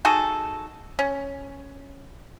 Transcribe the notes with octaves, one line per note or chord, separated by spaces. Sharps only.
D#4 F#4 G#4 A4
C#4